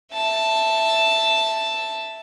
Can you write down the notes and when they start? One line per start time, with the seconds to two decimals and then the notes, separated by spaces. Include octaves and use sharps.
0.13 E5 A5